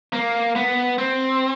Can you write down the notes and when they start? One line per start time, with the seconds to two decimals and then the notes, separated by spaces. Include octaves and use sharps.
0.13 A#3
0.56 B3
0.98 C4